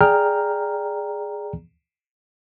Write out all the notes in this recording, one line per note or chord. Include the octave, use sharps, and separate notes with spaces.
G#4 D5 G5 A#5 F6